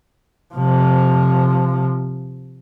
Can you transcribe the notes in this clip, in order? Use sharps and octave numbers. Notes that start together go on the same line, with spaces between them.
C3 F3